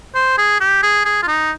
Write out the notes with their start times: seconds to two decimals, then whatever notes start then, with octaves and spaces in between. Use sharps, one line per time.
0.15 C5
0.38 G#4
0.61 G4
0.83 G#4
1.05 G#4
1.23 F4
1.28 D#4